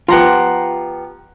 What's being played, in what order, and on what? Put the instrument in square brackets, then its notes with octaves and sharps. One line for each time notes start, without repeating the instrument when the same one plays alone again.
[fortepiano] F3 B3 [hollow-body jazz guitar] F4 G4 [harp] F#5 A#5 C6